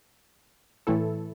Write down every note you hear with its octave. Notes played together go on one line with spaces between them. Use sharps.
A2 E3 A3 E4 A4